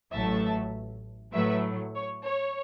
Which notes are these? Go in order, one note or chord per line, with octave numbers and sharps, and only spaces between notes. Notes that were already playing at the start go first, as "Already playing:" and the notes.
A1 A2 F#3 A3 E5 A5
A2 F#3 A3 B4 E5
C#5
C#5